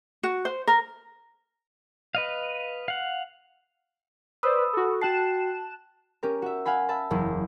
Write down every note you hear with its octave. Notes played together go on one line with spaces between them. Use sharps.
F#4
C5
A#4
B4 D#5 F5
F5 F#5
B4 C5 D5 B5 D#6 E6
F#4 A4
F#4 G5 A5 F#6 C7 E7
C#4 G4 A#4
F#4 E5
F5 F#5 G#5 B5
E5 A5 B5
F#1 E2 E3 E4